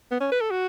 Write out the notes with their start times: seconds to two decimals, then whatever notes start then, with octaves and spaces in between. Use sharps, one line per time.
0.11 B3
0.21 C#4
0.32 B4
0.41 A4
0.51 F#4